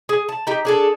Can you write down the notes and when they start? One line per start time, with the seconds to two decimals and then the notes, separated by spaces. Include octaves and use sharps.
0.09 G#4
0.29 A5
0.47 D#4 G4
0.65 D4 G#4 A4